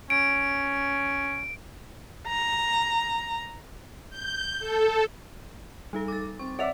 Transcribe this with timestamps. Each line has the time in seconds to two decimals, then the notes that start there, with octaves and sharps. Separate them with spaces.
0.10 C#4 D7
2.28 A#5
4.10 G6
4.59 A4
5.93 G3 D#4 A4
6.08 D6 A6
6.39 C4 C#6
6.59 C#5 D5 E5 F#5 A6 F7